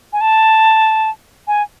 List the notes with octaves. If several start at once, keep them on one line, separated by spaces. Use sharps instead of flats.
G#5
A5
G#5